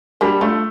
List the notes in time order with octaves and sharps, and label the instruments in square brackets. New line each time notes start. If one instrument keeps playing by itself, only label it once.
[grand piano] G3 [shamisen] A#3 D4
[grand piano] A3 [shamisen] D4 F4